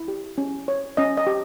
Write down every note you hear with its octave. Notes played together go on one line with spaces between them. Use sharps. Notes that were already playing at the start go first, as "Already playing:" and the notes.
Already playing: E4
G4
C#4
C#5
C#4 D#5
D#5
G4